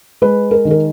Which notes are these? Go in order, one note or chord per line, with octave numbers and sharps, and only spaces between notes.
G#3 B4
A#4
D#3
A#4